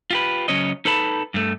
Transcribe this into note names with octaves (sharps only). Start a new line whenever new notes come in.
F4 G4 B4
C#3 F#3 C#4 C#5 D#5
D#4 A4 B4 A5 B5
G2 A3